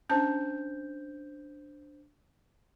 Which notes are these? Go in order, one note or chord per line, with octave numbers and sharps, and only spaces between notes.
C#4 D4 C5 A5 G6